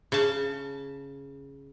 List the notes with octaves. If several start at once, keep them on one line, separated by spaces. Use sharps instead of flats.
C#3 A5